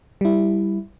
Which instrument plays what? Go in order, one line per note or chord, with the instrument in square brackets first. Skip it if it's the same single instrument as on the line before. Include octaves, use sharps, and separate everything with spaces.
[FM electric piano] G3 E4